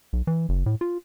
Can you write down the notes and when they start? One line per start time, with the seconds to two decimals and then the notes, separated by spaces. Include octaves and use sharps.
0.13 B1
0.27 E3
0.49 F#1
0.66 A2
0.81 F4